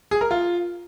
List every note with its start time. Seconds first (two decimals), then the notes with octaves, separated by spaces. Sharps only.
0.11 G#4
0.21 A#4
0.31 F4